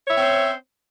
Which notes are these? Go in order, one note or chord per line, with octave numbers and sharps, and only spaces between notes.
C4 C#4 C5 C#5 E5